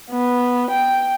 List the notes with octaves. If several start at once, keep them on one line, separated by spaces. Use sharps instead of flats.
B3
G5